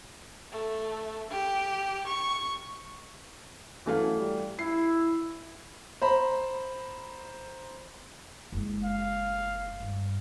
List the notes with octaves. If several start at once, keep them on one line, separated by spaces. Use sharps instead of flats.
A3
G4
C#6
F#2 E3 A3 F5
G3
E4 C7
C5 A#5 B5
F#1 G#3
F5
G2